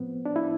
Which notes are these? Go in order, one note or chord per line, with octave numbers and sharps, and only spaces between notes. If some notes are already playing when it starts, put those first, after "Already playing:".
Already playing: A2 F3 B3 C4
D4
E4